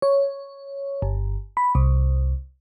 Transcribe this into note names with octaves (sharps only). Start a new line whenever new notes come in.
C#5
G1
B5
C2